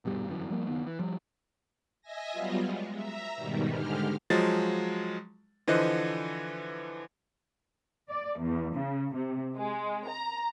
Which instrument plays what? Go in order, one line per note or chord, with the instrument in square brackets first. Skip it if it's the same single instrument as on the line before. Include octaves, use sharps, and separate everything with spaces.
[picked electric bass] D#1 G2 B2 G3
G1 F#2 E3
F3 G3 A#3
F#1 D#3 B3
E3
F3 G3
[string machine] D#5 E5 G#5 A#6
F#3 G3 B3 F4
G#3
E5 A#5
G#2 B2 D#3 G3
G#2 D3 G#3 G4 F6
[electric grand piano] F3 F#3 G#3 A6
D3 E3 F3 C5 D#5 F#6
[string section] D5
E2
C#3
C3
G#3
A#5